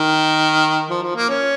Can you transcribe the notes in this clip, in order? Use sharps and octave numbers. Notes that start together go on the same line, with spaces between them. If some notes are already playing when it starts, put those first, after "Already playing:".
Already playing: D#3
F3
F3
A#3
C#4